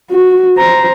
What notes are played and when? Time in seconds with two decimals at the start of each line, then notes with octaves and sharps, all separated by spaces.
0.11 F#4
0.57 C5 A#5